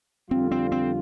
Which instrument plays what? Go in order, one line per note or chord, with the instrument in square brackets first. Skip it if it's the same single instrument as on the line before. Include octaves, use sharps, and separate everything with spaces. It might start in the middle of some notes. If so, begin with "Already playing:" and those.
[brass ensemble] F2 D3 G3 F4 [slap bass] C4
[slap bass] C4
C4